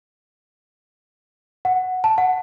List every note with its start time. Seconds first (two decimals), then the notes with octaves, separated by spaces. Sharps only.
1.65 F#5
2.04 A5
2.18 F#5